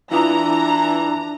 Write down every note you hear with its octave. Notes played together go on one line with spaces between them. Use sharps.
E3 D4 E4 F4 A#5 D#6